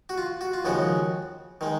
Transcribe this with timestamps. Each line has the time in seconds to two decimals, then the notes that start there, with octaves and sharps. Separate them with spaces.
0.09 F#4
0.18 F4
0.41 F#4
0.54 F4
0.65 D#2 C#3 F3 G#3 F#4
1.61 D#3 G#3